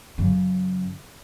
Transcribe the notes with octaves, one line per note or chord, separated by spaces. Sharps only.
F#2 C#3